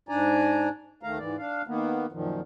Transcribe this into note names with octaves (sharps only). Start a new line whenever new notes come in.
G#2 D4 D5 G#5 A#5
D2 D#3 A3 F5 A#5
G#2 E3 D5
D4 F5
D#3 A#3 B3
F#2 A#2 D#3 F3